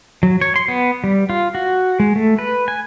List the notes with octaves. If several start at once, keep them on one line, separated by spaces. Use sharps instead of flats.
F#3
C#5
C6
B3
G3
F4
F#4
G#3
A3
B4
G#5